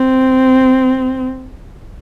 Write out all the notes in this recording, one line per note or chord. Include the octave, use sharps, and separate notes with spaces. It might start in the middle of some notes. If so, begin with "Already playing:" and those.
Already playing: C4